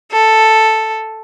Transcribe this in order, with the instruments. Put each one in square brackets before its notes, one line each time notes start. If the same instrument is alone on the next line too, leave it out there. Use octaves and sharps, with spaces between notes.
[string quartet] A4